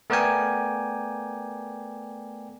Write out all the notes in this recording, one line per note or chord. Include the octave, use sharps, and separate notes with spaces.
A3 B3 A#4 D5 G5 G#5